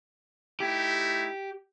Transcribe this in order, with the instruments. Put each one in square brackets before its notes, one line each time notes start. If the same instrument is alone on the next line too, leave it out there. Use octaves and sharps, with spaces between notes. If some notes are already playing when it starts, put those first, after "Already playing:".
[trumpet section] A3 D#4 E4 [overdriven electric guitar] G4